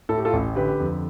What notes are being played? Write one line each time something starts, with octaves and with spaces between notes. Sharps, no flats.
A2 A4
G4
F4 A4
A1
D3 G4 B4
F2